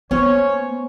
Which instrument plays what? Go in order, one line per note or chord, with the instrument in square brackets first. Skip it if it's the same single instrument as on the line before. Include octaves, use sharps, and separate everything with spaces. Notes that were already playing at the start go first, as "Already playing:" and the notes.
[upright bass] A#3 [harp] B3 [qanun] C#4 C5 [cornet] C#5